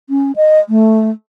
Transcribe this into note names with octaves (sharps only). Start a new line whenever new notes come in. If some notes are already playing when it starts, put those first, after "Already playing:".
C#4
D#5
A3